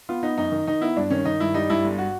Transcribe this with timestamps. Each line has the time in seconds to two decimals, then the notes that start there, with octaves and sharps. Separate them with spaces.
0.09 B3 F4
0.23 B3 D#4
0.38 F#2 D#4
0.52 D#3
0.67 D#3 D#4
0.81 B3 E4
0.97 G2 D4
1.10 D#3 C#4
1.25 D#3 D#4
1.40 G2 E4
1.54 G3 D#4
1.70 G2 E4
1.84 G1
1.98 F#4